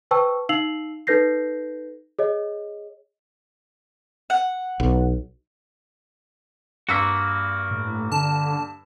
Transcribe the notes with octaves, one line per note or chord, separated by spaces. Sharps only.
B4 C5 G5 A5 C#6 E6
D#4 F5 E6 C7 F7 F#7
D#4 A4 B4 G6 A#6 C7
G#4 C#5 D#5
F#5
B1
G2 A#3 F#4 E6 B6
A2
D3 A5